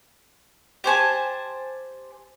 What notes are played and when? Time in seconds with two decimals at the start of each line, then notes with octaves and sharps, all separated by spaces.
0.84 G4 C5 G#5 A5